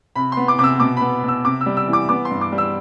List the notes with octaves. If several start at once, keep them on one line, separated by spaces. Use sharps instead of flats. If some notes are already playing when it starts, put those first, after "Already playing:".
C3 B5
B3 C6
D6
C3 D6
E6
B2 D6
B3 B5
B2
E6
C3 D6
E6
G3
E6
E3
D6
B3 D6
C6
G2
D6
G3
E6